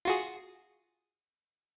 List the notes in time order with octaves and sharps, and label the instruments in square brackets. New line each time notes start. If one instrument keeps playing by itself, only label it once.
[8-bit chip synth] F4 F#4 G#4